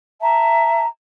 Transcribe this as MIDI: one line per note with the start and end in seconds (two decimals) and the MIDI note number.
0.20 0.84 76
0.20 0.84 81
0.20 0.84 82